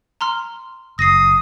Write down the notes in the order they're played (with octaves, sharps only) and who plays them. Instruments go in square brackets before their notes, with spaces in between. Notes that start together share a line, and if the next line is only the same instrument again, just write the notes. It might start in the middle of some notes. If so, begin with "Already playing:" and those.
[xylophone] A#5 C6 F6
[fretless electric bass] F#1 [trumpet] D#6 [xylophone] A#6 C7